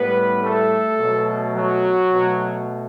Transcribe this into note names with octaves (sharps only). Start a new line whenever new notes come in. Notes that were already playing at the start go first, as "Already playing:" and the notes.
Already playing: A2 G3 B3 B4
A3 A4
B2 F#3 A3
F#3 F#4
B2 A3